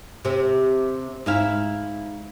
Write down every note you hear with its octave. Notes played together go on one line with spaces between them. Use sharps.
C3 C4
G#2 E4 F5